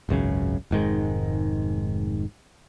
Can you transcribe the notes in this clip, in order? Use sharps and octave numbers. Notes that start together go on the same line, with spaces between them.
G#1 C#2 F#2 C#3
F1 G#2 D#3 G#3